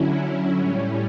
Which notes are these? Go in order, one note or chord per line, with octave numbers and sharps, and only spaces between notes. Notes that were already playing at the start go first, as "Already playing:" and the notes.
Already playing: D3 F#3 C#4 E4
A2 G3 C#4